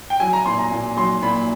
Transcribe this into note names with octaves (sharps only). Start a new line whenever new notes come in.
G5
F#3 G#5
A#5
A#2 C6
A#5
A#2
F#3 C6
A#2 B5